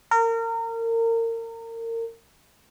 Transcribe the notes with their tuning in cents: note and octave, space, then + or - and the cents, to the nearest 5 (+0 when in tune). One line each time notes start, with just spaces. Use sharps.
A#4 -30